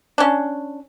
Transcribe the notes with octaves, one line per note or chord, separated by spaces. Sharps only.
C#4 D4